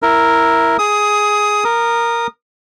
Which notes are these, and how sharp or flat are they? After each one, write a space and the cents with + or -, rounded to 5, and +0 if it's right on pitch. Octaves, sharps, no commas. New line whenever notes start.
E4 +0 A#4 +0 E5 +0
G#4 +0 D#6 +15
A#4 +0 D#6 -25